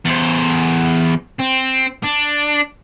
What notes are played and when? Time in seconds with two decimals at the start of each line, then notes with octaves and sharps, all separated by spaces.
0.05 E2 C5
1.40 C4
2.04 D4